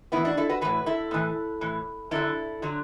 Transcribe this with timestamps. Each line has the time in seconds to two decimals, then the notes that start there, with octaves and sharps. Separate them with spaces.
0.12 A2 E3 B3 E4
0.25 D4 F#4
0.37 E4 A4
0.49 F#4 B4
0.61 A2 E3 F#4 B4
0.86 E4 A4
1.11 A2 E3
1.61 A2 E3
2.11 F#2 D3 F#3 E4 A4
2.62 D3 F#3